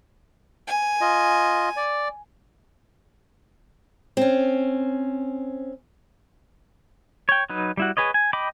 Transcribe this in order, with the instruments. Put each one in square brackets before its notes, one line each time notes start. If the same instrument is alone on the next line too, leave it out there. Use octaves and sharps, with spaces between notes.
[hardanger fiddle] G#5
[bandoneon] F4 D#5
D5
[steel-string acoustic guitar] C4 C#4
[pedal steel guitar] C#5 G5
F#3 D#4 B4
G3 E4 F#4
G#4 B4 C#5 D#5
G#5
D#5 G5 B5 D6